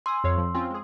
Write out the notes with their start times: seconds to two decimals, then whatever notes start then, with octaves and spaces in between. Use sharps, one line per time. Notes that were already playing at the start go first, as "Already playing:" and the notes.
0.06 G#5 C6 D#6 E6
0.24 F2 C#5 F5
0.38 F3
0.54 C4 C#4 F4
0.70 G#3 G#4